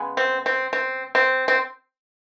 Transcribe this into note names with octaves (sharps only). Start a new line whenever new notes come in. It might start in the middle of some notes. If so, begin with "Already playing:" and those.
Already playing: C#3 G#3 B3
C4
C4
C4
C4
C4